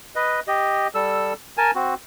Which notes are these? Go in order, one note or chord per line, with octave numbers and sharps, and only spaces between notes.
B4 D#5
G4 D#5
G3 A4 E6
A#4 G#5 A5
C4 F#4